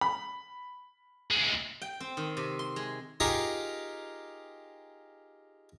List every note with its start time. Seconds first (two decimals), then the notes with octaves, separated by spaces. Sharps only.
0.01 B5
1.31 D2 G#3
1.82 G5
2.00 C4
2.17 D#3
2.37 C3
2.59 C6
2.76 G#3
3.20 D#4 F4 G4 G#4 A#4 F5